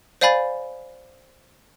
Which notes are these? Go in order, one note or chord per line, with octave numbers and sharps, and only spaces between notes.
C5 D5 F5 G#5 B5 A6